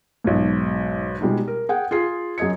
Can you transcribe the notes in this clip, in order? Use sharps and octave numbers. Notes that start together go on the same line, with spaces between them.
B1 G#2
B2 G3 G#3 D#4
A#4
G#4 F#5 G5
F4 G#4 C7
F#2 G#4 D#5 G#6 C#7